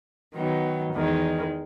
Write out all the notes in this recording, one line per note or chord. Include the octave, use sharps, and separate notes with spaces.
D#3 F#3 B3 D#4
E2 D#3 G#3